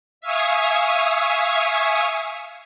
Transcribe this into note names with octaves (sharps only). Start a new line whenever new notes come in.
E5 F5 G#5 C#6 D#6